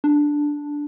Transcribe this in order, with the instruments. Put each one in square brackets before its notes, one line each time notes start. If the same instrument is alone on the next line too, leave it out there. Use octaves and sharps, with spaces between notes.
[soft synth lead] D4